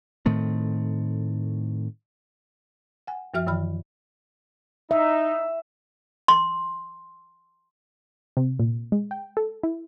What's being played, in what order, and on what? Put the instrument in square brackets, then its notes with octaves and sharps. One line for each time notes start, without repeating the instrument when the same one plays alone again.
[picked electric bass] A2 D#3 A3 C4
[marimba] F#5 G#5
F#2 F3 F#4 E5 F6
F#2 D#3 E3 B5 F6
[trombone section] D#4 [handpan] E5
[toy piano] C6
[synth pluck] C3
A#2
G#3
G5
A4
E4